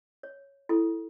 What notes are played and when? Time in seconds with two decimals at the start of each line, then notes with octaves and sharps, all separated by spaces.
0.23 C#5
0.69 E4 A4